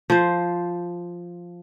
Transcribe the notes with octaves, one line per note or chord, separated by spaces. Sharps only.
F3 C5